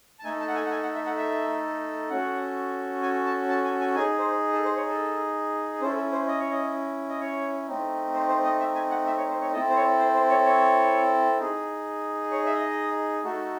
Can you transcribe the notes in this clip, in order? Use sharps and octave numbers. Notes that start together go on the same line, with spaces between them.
A5
A3 D#4 A4 G#5
A5
F#5
G#5
F#5
G#5
F#5
E5
F#5
E5
C#4 F#4 A4 F#5
G#5
A5
A5
G#5
G#5
D#4 G#4 G#5
C5
A4
C5
C#5
A4
C#4 E4 A4 C5
A4
C5
D#5
C#5
D#5
D#5
C#5
A3 C4 D#4
C5
C5
D#5
E5
G#5
F#5
E5
C#5
C5
C#5
C4 E4 A4 D#5
C5
C#5
C5
C5
C#5
C#5
D#4 G#4
C#5
E5
D#5
A3 D#4 F#4 A4